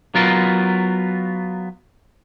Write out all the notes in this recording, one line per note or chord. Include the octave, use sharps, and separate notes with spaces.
F#3 B3 F4 A#4